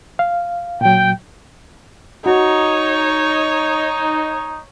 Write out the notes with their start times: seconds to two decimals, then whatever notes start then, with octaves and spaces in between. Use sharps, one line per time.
0.19 F5
0.81 A#2 F#3 G5
2.26 D#4 F#4 C#5